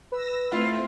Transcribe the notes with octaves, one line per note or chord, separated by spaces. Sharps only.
B4 E6 A#6
A2 A3 C4 E4 F4